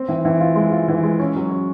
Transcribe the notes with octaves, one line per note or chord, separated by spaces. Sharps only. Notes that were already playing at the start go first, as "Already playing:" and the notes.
Already playing: C4
E3
E3
F4
G#3
F4
E3
G#3
C#4
F#3
C#4